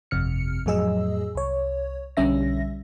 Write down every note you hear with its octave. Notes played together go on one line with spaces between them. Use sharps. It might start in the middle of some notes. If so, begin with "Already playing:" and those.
G1 F2 C3 F6 C#7
F2 A2 F#3 G#4 D#5 E6
C2 C#5
B1 D3 G3 C#4 E5 A#6